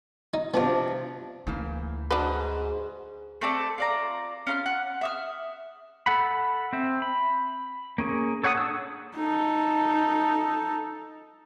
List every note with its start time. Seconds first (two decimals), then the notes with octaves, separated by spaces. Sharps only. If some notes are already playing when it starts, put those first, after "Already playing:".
0.34 D#4
0.54 C3 F3 B3 D4 F4
1.47 D2 C#3 E3 A#3
2.11 G#2 D4 F#4 B4 D#5
3.41 A3 C4 A4 D5
3.78 F4 D5 A#5
4.47 C#4 F4 B5 F6
4.66 F#5
5.01 E5 D#6 F6
6.06 A4 F#5 B5
6.73 C4 E5
7.02 B5
7.98 A#3 C#4 G#4
8.43 A4 C#5 F#5 B5 D#6
8.57 D4 E6
9.16 D#4 A4